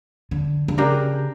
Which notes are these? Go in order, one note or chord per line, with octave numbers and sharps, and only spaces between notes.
D3
D3
C#3 D4 G4 A#4